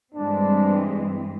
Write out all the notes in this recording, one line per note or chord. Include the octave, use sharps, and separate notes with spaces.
G2 E3 G#3 C4 D4